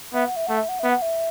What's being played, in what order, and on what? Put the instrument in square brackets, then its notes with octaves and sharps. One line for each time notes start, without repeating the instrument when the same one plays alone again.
[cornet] B3 [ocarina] E5
[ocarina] F#5
E5
[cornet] A3 [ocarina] F#5
[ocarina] E5
F#5
[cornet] B3 [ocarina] E5
[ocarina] F#5
E5